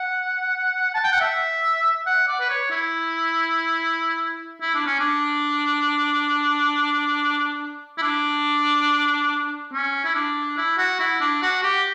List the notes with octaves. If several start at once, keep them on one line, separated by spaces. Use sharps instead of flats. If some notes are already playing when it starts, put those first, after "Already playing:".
Already playing: F#5
A5
G5
F#5
E5
F#5
D5
B4
C#5
E4
E4
D4
C#4
D4
E4
D4
C#4
E4
D4
E4
F#4
E4
D4
F#4
G4